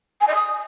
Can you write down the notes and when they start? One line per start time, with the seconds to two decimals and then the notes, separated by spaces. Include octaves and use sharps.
0.21 G#5
0.28 D#5
0.35 D#6